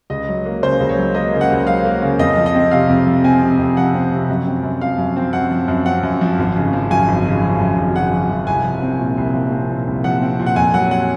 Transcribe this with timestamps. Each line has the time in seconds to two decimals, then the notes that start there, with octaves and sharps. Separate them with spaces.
0.10 C#2 D#5
0.28 F#3
0.46 A#3
0.63 C#3 C5
0.80 C#2
0.89 C#5
0.97 F#3
1.15 A#3 D#5
1.33 C#3
1.41 F#5
1.50 C#2
1.67 F#3 F5
1.85 A#3
2.02 C#3
2.19 F2 D#5
2.37 F3
2.46 D#5
2.55 C4
2.71 C3 F5
2.89 F2
3.07 F3
3.24 C4 G#5
3.42 C3
3.59 F2
3.77 F3 F#5
3.95 C4
4.11 C3
4.29 F#2
4.47 C4
4.63 F#2
4.81 F3 F5
4.98 F#2
5.16 C4
5.33 F#2 F#5
5.51 F3
5.68 F#2
5.86 C4 F#5
6.03 F#2
6.21 F3
6.39 G#1
6.56 C#3
6.73 F3
6.90 F#2 G#5
7.08 G#1
7.26 C#3
7.42 F3
7.60 F#2
7.78 G#1
7.95 C#3 F#5
8.13 F3
8.29 F#2
8.47 C2 G#5
8.64 F3
8.82 C4
8.99 A#2
9.18 C2
9.35 F3
9.52 C4
9.70 A#2
9.87 C2
10.04 F3 F#5
10.22 C4
10.40 A#2
10.46 F#5
10.56 F2 G#5
10.74 F#3 F#5
10.91 F#5